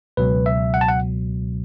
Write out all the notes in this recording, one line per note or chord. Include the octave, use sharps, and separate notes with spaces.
C#2 B2 F#3 B4
E5
F#5
A5
F#5